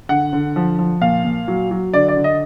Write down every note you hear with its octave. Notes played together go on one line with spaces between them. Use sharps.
D3 F#5
D3
F3
F3
A#2 F5
A#2
F#3
F#3
D3 D5
D5
D3
D#5